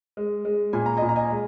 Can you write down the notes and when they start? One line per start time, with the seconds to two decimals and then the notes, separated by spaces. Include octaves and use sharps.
0.17 G#3
0.45 G#3
0.73 A#2 G#5
0.86 A#5
0.97 D#5 G#5
1.02 A#2
1.09 A#5
1.16 D#5 G#5
1.30 G#3